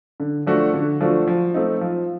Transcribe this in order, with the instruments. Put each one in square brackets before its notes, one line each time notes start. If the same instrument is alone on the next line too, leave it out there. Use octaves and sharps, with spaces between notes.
[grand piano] D3
F3 A3 D4 F#4
D3
F3 A3 D4 F#4
F3
A3 C4 D#4
F3